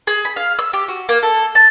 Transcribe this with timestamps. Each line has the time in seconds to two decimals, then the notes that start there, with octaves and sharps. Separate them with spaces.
0.07 G#4
0.25 B5
0.36 F5
0.59 E6
0.73 G4
0.88 F#4
1.09 A#3
1.23 A4
1.55 A5